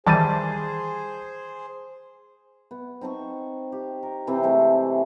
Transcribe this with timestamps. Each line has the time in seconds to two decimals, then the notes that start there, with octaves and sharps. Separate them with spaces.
0.06 D#3 E3 G3 G#4 C5 A5 A6 D#7
2.71 B3
3.01 C4 D#4 A4 C#6
3.72 G4
4.03 A#4
4.27 C3 E3 C4 G5
4.43 G#3 A3 C4 E4